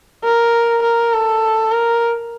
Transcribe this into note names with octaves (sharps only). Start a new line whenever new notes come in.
A#4
A#4
A4
A#4